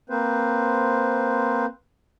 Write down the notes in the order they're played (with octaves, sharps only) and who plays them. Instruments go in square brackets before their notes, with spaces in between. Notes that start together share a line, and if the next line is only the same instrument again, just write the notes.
[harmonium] A#3 C4 B4 C5